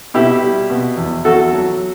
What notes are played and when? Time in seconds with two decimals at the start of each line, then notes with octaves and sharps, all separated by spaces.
0.14 B2 E4 G4
0.42 G3
0.70 B2
0.97 E2
1.25 E2 F#4 A4
1.53 F#3